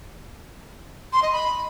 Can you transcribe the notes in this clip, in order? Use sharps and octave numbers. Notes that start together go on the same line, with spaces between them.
C6
D#5
B5